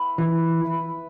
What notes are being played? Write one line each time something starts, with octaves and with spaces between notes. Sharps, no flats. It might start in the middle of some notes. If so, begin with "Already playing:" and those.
Already playing: B3 E4 B4
E3
E4 B4 E5